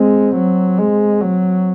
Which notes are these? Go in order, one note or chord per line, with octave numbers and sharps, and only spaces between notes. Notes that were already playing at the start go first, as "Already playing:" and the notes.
Already playing: G#3 C4
F#3
G#3
F#3